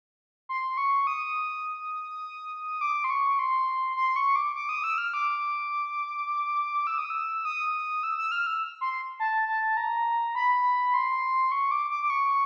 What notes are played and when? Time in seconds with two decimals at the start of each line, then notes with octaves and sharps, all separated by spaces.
0.49 C6
0.77 C#6
1.07 D#6
2.81 D6
3.04 C6
3.10 C#6
3.39 C6
3.97 C6
4.16 C#6
4.36 D6
4.55 D6
4.69 D#6
4.84 E6
4.98 F6
5.14 D6
6.87 E6
6.98 D#6
7.10 E6
7.45 D#6
8.03 E6
8.18 E6
8.32 F6
8.47 E6
8.81 C6
9.20 A5
9.49 A5
9.77 A#5
10.35 B5
10.94 C6
11.52 C#6
11.71 D6
11.90 D6
12.03 D6
12.10 C#6